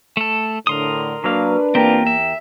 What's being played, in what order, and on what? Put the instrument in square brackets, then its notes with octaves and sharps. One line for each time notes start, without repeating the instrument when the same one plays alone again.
[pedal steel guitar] A3 A4
[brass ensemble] A2 D3 [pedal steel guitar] A#4 C6 D#6
[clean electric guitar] F#3 A#3 F5 [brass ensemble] D4 B4
[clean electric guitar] E2 G4 A#4 [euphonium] A#3 [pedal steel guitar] C4 F4
[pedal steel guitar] E5